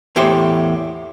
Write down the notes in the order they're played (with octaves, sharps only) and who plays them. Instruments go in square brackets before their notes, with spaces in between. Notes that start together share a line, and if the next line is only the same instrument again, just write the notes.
[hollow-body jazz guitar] E2 A2 G4 C5